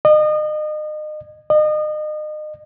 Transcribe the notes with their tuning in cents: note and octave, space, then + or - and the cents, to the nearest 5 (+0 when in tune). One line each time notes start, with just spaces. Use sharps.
D#5 -35
D#5 -35